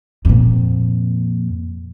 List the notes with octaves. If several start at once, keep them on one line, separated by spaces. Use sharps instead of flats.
F2 A#2